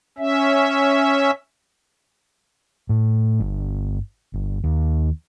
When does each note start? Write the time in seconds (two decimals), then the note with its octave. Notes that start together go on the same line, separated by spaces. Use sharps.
0.18 C#4 E5
2.89 A2
3.40 G1
4.34 G1
4.64 D#2